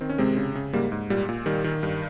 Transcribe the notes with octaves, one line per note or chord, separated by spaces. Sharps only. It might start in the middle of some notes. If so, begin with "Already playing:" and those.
D#3 C4
C#4
C3 G#3 C4
C#3
C#3
G#2 G3 A#3
G#2
A#2 G3
A#2
D#3 G3
D#3
G2